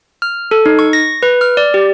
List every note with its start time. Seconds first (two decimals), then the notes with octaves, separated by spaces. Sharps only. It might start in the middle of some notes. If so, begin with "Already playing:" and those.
0.22 F6
0.51 A4
0.66 D#4
0.79 C#6
0.93 A#6
1.23 B4
1.41 F6
1.57 D5
1.74 G4